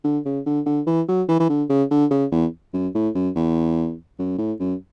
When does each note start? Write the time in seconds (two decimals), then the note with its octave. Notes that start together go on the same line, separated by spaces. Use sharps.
0.04 D3
0.25 C#3
0.46 D3
0.66 D3
0.87 E3
1.08 F#3
1.29 E3
1.39 E3
1.49 D3
1.69 C#3
1.91 D3
2.10 C#3
2.31 E2
2.73 F#2
2.94 A2
3.15 F#2
3.35 E2
4.19 F#2
4.38 A2
4.60 F#2